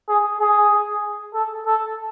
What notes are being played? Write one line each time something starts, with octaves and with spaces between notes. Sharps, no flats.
G#4
G#4
A4
A4